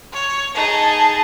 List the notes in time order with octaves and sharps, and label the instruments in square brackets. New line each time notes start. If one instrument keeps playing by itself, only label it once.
[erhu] C#5
[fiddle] D#4 G#4 [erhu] A5